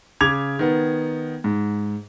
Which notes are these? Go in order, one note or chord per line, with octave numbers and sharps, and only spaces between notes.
C#3 D6 G#6 F7
D#3 B3
G#2